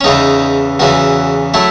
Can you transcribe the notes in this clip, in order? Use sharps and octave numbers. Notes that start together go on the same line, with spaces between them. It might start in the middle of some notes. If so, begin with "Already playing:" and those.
C#4
E2 C#3 E3 D#4
E2 C#3 E3 F#4
F#3 A3 E4